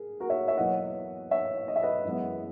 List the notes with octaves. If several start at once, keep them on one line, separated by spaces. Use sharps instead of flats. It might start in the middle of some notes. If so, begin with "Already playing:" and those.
Already playing: G#4 A#4
F#4 A#4
C#5 E5
C#5 E5
E2 B2 F#3 A#3 D#5 F#5
C#5 E5
D#5
E5
B4 D#5
F#2 E3 G#3 B3